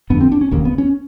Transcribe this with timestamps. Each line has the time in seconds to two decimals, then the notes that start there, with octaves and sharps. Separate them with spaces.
0.10 G1 F2 D3 B3
0.21 C4
0.32 D4
0.41 C#4
0.51 E1 D#2 C#3 A#3
0.65 B3
0.78 C#4